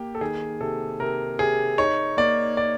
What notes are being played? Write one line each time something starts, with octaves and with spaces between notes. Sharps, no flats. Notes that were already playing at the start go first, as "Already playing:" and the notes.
Already playing: A#3 G4
A4
D#3 G#4
C3 A4
C3 A#4
C3 G#4
D#4 C#5
A#3 D5
D5